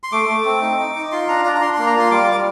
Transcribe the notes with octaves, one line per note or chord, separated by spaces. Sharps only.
C6
A3 D6
A3
C4
D#4
D#4
D#4
F4 C6
D4 A#5
D4 A#5
A#5
D4 C6
A#3 C6
A#5
F4 C6
G3 D6
G3 D6